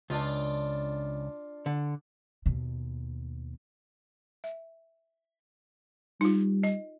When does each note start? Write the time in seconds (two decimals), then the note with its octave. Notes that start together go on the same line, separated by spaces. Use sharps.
0.10 C#2 D4 F4
1.66 D3
2.46 D#2 B2
4.44 E5
6.21 G3 D#4 F4
6.63 D#5